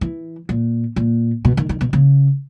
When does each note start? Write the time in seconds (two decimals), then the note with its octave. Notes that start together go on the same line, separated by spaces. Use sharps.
0.01 E3
0.49 A#2
0.96 A#2
1.45 B2
1.57 D#3
1.69 D#3
1.81 B2
1.93 C#3